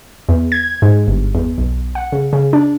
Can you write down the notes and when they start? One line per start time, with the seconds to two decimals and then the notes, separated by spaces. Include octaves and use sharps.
0.29 E2
0.52 G#6
0.82 G#2
1.07 G1
1.35 E2
1.58 B1
1.95 F#5
2.12 C#3
2.33 C#3
2.53 D4